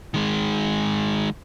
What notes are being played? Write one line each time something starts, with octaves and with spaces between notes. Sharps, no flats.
D#3 G#3